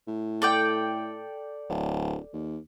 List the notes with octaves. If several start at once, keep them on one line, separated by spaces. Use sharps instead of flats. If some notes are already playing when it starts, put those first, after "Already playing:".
A2
A4 D5 G5
D1
D#2